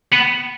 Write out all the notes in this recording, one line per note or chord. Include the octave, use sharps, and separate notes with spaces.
B3